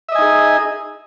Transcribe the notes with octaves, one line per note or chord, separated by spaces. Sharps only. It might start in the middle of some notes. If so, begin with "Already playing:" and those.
D#4 G#4 D#5 E5 G#5